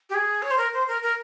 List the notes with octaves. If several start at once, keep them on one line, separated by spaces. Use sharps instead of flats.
G4
G#4
C#5
C5
A#4
C5
A#4
A#4